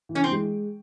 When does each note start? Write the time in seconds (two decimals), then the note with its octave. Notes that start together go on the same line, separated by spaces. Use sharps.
0.09 E3
0.15 C#4
0.24 C4
0.31 G#3